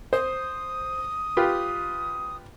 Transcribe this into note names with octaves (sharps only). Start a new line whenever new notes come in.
C5 D#6
F4 G4 B4